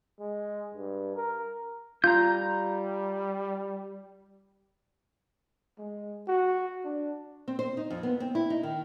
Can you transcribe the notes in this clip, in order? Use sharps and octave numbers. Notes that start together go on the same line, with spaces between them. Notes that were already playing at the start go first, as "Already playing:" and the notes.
G#3
G2
A#4
G3 F4 A#5 G6
G#3
F#4
D4
C4
C5
D#4
F2
B3
C4
E4
D#4
D#3